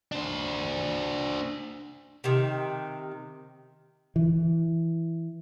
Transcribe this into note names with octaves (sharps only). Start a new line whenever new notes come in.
D4 C5
C3 D#3
E3